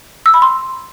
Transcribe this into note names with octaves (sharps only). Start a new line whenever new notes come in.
E6
B5
C6